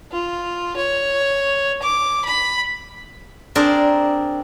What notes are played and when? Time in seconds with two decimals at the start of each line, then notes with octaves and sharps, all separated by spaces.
0.11 F4
0.76 C#5
1.82 D6
2.24 B5
3.55 C4 D4 G#4 A#4 D5